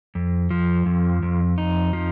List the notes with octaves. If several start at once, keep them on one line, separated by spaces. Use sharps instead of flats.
F2
F3
F2
F2
D#4
F3